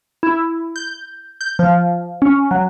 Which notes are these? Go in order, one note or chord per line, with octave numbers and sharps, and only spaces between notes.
E4
G6
G6
F3
C#4
F#3